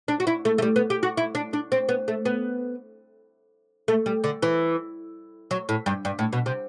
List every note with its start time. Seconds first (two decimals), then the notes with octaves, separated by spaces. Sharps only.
0.08 D4
0.20 F#4
0.27 E4
0.45 A3
0.58 A3
0.62 G3
0.76 B3
0.90 G4
1.03 F#4
1.17 E4
1.35 D4
1.53 D4
1.72 C4
1.89 B3
2.08 A3
2.25 B3
3.88 A3
4.06 G3
4.24 D3
4.42 E3
5.51 F#3
5.69 A2
5.86 G2
6.05 G2
6.19 A2
6.33 B2
6.46 C3